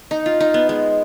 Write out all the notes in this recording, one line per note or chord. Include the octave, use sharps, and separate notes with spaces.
D#4
F4
D#4
B3
G#3